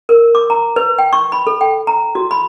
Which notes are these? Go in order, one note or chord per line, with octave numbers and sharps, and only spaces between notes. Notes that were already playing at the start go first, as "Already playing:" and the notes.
A#4
D6
A#5
B4
G5
C#6
B5
A4
G5
A#5
F#4
B5